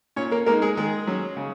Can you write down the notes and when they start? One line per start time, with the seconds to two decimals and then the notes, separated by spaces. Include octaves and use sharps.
0.16 A#2 C#4 C#5
0.31 A#3 A#4
0.46 G#3 A#3 D#4 A#4
0.62 G#3 G#4
0.77 D#3 G#3 G#4
1.07 F#3 C#4
1.37 C#3